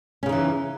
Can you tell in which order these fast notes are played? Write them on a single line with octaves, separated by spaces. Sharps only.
C#4 C#3 D#4 E3